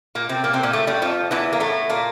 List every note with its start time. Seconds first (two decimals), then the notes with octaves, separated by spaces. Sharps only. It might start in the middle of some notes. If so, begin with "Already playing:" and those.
0.15 A#2 A#3
0.29 C3 C4
0.44 A#2 A#3
0.53 C3 C4
0.63 A#2 A#3
0.73 A2 A3
0.87 G2 G3
1.02 F2 F3
1.31 E2 E3
1.53 A#3
1.60 A2 A3
1.89 A#2 A#3